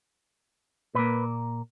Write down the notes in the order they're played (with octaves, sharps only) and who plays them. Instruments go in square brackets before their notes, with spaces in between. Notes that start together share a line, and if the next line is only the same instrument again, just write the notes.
[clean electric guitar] A#2 A#3 B4